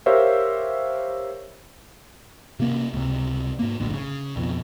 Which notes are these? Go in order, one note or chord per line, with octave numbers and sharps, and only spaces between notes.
G4 A#4 C5 C#5 E5 F5
C3 A#3 C#4
C#2 C3
G#2 A#3
F1 A#1 A2 D3
C#3
B1 F2 B2